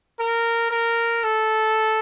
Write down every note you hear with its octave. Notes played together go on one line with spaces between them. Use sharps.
A#4
A#4
A4